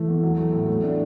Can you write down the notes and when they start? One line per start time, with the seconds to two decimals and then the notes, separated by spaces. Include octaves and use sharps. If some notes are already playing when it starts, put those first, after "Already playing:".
Already playing: E3 A3
0.08 E2
0.23 F#3
0.38 A3
0.53 A2
0.68 A3
0.83 D4